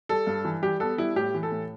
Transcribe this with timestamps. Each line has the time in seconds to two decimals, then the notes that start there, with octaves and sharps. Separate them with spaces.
0.09 G3 A4
0.27 G2
0.45 E3
0.62 G3 G4
0.80 B3 A4
0.98 G3 E4
1.16 A2 G4
1.34 E3
1.43 A4
1.51 A2